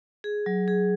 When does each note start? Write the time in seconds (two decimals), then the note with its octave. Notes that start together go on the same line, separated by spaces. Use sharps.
0.24 G#4
0.46 F#3
0.68 G#4